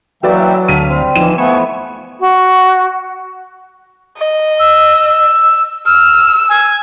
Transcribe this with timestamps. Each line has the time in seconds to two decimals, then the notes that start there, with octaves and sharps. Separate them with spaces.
0.23 E3 F#3 A#3 F#4 B4 D5 E5 G5
0.68 D2 A4 F5 B6 D#7
0.89 G3 C4
1.16 E3 F3 D#4 E7
1.38 F3 A3 B3 E4 G#5 C#6
2.20 F#4
4.17 D#5
4.59 E6
5.09 E6
5.86 E6 F6
6.49 G#5